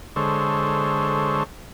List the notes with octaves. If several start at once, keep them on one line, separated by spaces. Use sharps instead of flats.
D3 G#3 A4 C5 C#5